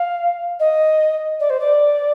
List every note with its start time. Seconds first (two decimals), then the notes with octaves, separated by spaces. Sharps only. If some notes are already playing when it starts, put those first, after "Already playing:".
Already playing: F5
0.60 D#5
1.40 D5
1.50 C5
1.60 D5